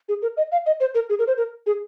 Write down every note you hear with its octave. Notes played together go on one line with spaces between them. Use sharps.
G#4
A#4
D#5
F5
D#5
C5
A#4
G#4
A#4
C5
A#4
G#4